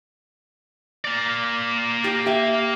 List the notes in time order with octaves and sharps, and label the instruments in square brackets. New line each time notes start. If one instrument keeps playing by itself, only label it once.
[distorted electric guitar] A#3 D5
[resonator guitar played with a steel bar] G4
G4 E5